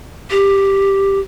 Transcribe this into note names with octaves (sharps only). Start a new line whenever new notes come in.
G4